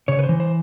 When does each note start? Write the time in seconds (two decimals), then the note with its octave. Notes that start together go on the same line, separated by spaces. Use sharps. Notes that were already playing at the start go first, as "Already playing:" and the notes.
0.08 C#3 C#5
0.19 B4
0.23 C5
0.29 E3
0.40 C5